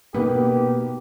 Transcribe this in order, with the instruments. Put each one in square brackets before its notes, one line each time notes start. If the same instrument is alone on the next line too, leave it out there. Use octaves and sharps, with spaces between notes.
[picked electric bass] B2 A#3 B3 [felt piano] D#4 A#4 B4 [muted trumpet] G4